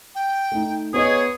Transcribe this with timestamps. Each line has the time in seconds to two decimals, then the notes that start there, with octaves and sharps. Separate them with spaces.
0.15 G5
0.52 A3 D#4
0.94 B3 G#4 B4 C#5 D#5